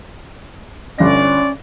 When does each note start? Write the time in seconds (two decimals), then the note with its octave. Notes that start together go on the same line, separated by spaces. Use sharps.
0.98 G1 C#4 D5 A#6